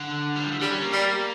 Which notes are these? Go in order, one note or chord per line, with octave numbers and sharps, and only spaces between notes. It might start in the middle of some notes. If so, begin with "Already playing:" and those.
Already playing: D3
G3
F3
E3
D3 G3
C#4
A#3
G3